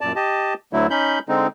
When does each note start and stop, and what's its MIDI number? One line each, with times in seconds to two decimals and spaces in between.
0.01 0.12 42
0.01 0.12 46
0.01 0.12 74
0.01 0.12 81
0.16 0.54 67
0.16 0.54 75
0.16 0.54 81
0.73 0.87 38
0.73 0.87 50
0.73 0.87 54
0.73 0.87 57
0.73 0.87 64
0.90 1.19 61
0.90 1.19 63
0.90 1.19 83
0.90 1.19 91
1.29 1.47 50
1.29 1.47 56
1.29 1.47 60
1.29 1.47 63